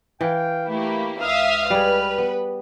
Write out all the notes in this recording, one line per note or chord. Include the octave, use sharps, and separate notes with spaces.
E3 F5 G5
A3 A#3 E4 G4
C#2 E5 F5 D#6 F6
G3 G#4 B4
B3